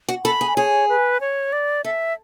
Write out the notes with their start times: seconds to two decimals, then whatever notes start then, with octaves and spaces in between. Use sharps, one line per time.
0.09 F#4
0.25 A4 B5
0.41 G#4
0.57 G#4 C#5
0.89 B4
1.21 C#5
1.53 D5
1.84 A4 E5